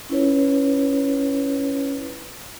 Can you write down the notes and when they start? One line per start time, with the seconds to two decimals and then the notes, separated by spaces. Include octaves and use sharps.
0.09 C#4 E4 F4 B4 C#5